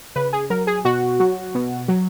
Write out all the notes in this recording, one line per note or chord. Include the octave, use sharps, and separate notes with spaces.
C#3 B4
G#4
F#3 A#4
G#4
B2 F#4
F#3
B2
F#3